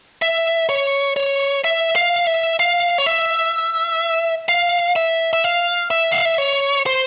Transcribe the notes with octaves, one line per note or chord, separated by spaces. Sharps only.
E5
C#5
C#5
E5
F5
E5
F5
C#5
E5
F5
E5
E5
F5
E5
F5
E5
C#5
C5